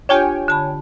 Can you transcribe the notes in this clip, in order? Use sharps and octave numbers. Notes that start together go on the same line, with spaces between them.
D4 F4 G4 C#5 G5 G#5
D3 A5 B5